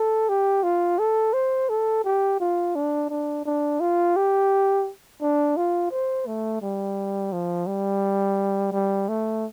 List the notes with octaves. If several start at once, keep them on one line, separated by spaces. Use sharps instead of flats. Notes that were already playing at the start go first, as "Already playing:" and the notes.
Already playing: A4
G4
F4
A4
C5
A4
G4
F4
D4
D4
D4
F4
G4
D4
F4
C5
A3
G3
F3
G3
G3
A3